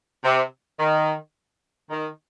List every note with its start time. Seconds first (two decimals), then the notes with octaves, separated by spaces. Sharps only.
0.24 C3
0.79 D#3
1.90 D#3